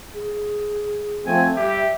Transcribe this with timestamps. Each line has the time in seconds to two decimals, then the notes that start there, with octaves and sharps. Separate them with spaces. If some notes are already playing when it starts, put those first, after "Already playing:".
0.14 G#4
1.26 F3 A3 C4 G#5
1.56 G3 G4 E5